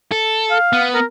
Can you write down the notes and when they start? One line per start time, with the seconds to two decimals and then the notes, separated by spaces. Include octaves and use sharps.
0.12 A4
0.51 F5
0.73 B3
0.94 A#4